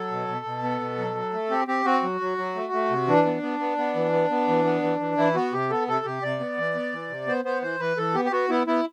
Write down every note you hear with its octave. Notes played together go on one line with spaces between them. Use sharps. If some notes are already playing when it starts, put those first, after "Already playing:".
Already playing: F#3 A4
B2
B2
B2
B3
B2
F#3
F#3
A3
C4 G4
C4 G4
C4 F#4
F#3
F#3
F#3
A3
A3
C3
E3 D4
B3
B3
B3
B3
E3
B3
B3
E3
B3
E3
E3
E3 E4
B3 F#4
C3 G4
B3 A4
C3 A4
C3 G4
C3 D5
B3
E3
B3
E3
C3
B3 C5
B3 C5
E3 C5
E3 B4
E3 A4
B3 G4
G4
B3 F#4
B3 E4
B3 E4